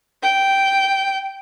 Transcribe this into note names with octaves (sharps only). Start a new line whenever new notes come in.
G5